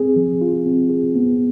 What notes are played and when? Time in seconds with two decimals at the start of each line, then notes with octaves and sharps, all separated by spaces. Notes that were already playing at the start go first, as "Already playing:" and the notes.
Already playing: C4 G#4
0.16 F3
0.41 F4
0.66 C4
0.90 G#4
1.15 B3